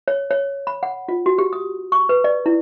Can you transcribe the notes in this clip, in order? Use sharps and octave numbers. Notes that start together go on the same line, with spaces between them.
C#5
C#5
B5
F#5
F4
F#4
G4
D#6
C#6
B4
D5
E4